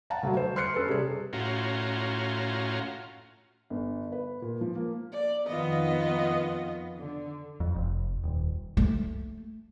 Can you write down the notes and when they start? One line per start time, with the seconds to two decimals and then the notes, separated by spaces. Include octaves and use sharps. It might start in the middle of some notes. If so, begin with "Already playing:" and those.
0.10 F5 F#5 A5 A#5
0.23 D2 G2 F#3
0.37 C5
0.56 C6 F6 F#6 C7 C#7
0.74 C#4 A4 B4
0.88 C3 G3 G#4
1.33 A2 C#4 F4 F#4 A#5 C6
3.70 G1
4.12 B4
4.42 A#2
4.61 F3
4.75 A#3
5.13 D5
5.47 F2 D#3 B3 F4 D#5
6.98 D3
7.60 F2
7.75 F1
8.23 D#1
8.77 A3